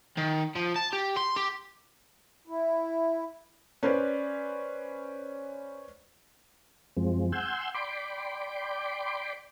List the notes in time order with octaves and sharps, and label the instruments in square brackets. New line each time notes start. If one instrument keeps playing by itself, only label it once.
[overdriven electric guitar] D#3
F3
A5
G4
C6
G4
[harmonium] E4
[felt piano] C#4 B4 C5 D5
[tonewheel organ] F#2 F3 G#3 C4
F#5 G#5 C6 E6 G6
D5 G5 B5 C6 D6